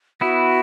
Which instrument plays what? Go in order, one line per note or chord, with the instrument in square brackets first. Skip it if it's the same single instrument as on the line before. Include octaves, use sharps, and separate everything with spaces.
[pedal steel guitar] B3 E4 [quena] F#4